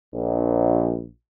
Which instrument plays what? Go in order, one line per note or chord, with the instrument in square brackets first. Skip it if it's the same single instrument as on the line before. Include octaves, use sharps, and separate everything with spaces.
[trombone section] A#1